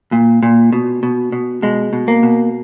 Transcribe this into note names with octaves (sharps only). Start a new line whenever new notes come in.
A#2
A#2
B2
B2
B2
B2 G#3
B2
A#3
B2